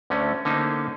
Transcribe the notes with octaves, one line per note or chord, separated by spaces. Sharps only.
D2 D3 A3 C#4
D3 A#3 C#4 D#4 C5